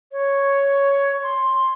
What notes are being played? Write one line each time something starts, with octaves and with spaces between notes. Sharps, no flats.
C#5
C6